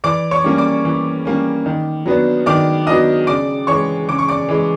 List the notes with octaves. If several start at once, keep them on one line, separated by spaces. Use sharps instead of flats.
E3 D5 D6
C#5 C#6
G3 A#3 C#4
D5 D6
E3
G3 A#3 C#4
D#3
F#3 B3 D4
D#3 D5 D6
F#3 B3 D4 D#5 D#6
C#3 D5 D6
E3 G#3 C#5 C#6
C#3 D6
C#6
D5 D6
E3 G#3